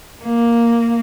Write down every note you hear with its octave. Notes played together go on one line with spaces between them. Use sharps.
A#3